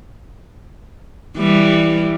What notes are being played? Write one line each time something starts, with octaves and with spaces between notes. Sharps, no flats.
E3 G3